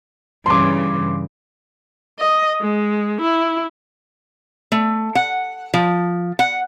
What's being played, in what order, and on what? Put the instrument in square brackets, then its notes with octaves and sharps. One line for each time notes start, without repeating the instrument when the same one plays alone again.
[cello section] G2 C#3 E3 [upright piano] C6 D6
[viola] D#5
G#3
E4
[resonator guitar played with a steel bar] A3
F#5
F3
F#5